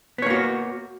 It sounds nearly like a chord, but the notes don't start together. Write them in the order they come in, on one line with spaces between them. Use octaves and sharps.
B3 C#5 A#3 F#4